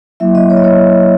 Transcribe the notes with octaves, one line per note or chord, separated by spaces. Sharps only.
F#3 A#3 E4 E5
D#5
C#5
D#5
C#5